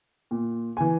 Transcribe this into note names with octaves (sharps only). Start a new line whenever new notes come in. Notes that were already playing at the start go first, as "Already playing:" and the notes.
A#2
E3 G#5